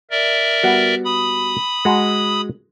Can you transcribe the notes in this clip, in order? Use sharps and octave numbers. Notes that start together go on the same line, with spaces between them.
A#4 D5 E5
G3 B3 F#4
B5 D#6
G#3 F#4 A#5